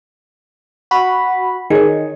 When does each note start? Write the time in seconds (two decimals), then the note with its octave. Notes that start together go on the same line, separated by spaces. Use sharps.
0.91 F#4 B5
1.70 D#3 G#4 C#5